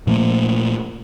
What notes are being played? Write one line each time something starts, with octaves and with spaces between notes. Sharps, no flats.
A#2 F3 A3 A#3